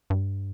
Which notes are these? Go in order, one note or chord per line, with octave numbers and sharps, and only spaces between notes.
G2